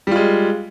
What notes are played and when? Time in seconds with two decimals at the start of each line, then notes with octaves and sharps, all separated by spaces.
0.07 G3
0.11 F4
0.16 G#3